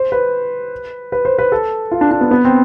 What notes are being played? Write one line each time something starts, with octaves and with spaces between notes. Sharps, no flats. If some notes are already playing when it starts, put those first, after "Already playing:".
Already playing: C5
B4
B4
C5
B4
A4
F4
D4
D4
B3
B3
C4